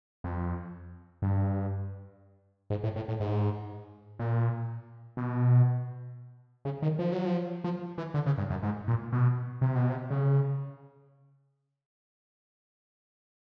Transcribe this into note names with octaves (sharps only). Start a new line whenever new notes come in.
F2
G2
G#2
A2
A2
A2
G#2
A#2
B2
C#3
D#3
F3
F#3
F3
F3
E3
D3
C#3
G2
F#2
G#2
A#2
B2
C3
B2
C3
C#3